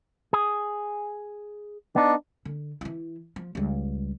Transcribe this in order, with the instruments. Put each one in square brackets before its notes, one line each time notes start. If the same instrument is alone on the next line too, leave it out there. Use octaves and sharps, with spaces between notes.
[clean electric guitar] G#4
[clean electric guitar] B3 D#4 [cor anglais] D4
[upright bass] D3
E3 E4
F3
C#2 G3